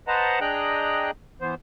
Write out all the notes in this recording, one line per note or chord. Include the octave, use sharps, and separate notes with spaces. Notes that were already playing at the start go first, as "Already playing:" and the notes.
B4 C5 D#5 F#5 A5 A#5
D4 G#4 D#5 G5 A#5 F#6
E3 B3 C5